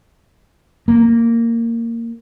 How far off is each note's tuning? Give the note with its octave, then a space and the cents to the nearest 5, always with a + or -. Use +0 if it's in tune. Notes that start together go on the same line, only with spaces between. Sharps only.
A#3 -15